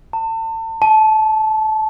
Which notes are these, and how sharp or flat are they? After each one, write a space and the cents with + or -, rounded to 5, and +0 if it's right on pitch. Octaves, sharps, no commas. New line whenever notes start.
A5 +35
A5 -20